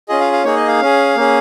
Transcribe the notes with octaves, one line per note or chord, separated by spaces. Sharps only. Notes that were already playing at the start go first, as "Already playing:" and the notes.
C#4 F4 G#4 D#5
F5
F5
A#3 D#4 G#4 C#5
D#5
F5
C#4 G#4
A#3 C#4 G#4